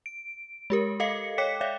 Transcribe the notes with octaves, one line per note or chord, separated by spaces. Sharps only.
D7
G#3 G4 A#4
A4 D#5 F5 C#7
C#5 G5 D6 B6 C#7
C#5 D5 E5 F5